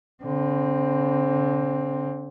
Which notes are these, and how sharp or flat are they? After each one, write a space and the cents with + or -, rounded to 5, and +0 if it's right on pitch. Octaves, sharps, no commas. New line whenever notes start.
D3 -35 C4 +5